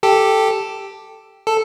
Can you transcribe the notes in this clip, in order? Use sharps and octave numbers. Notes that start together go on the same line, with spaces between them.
G4 A4
A4